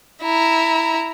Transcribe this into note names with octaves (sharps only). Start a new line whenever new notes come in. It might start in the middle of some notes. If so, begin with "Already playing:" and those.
E4 A#5